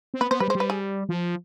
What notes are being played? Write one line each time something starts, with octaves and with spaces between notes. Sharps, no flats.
C4
B3 B4
B3 C5
G3 B4
G#3 C5
G3
B4
G#4
F3